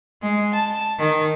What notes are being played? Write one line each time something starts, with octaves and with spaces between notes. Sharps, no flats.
G#3
A5
D#3